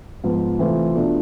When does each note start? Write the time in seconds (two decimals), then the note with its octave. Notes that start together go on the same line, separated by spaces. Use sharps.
0.24 G#2 F3 B3
0.59 C3 E3 A3 C4 F4
0.95 B2 A3 D4 F4